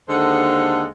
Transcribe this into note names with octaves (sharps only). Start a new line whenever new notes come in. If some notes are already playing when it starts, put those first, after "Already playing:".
D#2 D3 G#3 A4 C5 F#5